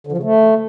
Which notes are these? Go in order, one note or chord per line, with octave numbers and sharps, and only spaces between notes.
D3
F3
C#3
A3